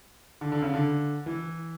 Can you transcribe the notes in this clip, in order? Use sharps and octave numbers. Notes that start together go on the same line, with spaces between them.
D3
D3
C#3
D3
E3